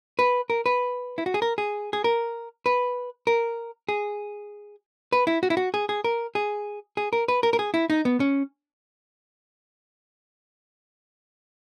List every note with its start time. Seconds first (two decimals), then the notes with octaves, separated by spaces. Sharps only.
0.19 B4
0.50 A#4
0.66 B4
1.18 E4
1.26 F#4
1.34 G#4
1.42 A#4
1.58 G#4
1.93 G#4
2.04 A#4
2.66 B4
3.27 A#4
3.89 G#4
5.12 B4
5.27 E4
5.43 F#4
5.50 E4
5.57 F#4
5.74 G#4
5.89 G#4
6.04 A#4
6.35 G#4
6.97 G#4
7.13 A#4
7.28 B4
7.43 A#4
7.53 A#4
7.59 G#4
7.74 E4
7.90 D#4
8.05 B3
8.20 C#4